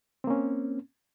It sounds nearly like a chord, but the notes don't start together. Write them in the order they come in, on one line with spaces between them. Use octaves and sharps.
C4 A#3 C#4